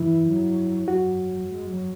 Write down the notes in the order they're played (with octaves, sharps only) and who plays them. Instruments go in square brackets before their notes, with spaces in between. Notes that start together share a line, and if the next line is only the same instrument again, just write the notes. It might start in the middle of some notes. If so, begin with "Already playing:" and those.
Already playing: [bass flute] E3 [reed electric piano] E4
[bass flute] F#3
[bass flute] F#3 [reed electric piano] F#4
[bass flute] G#3
F#3